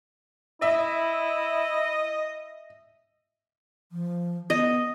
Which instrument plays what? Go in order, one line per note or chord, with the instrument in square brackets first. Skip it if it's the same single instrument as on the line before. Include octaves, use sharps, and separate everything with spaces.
[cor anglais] E4 [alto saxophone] D#5 [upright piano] E5
[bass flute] F3
[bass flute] B3 [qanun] D#5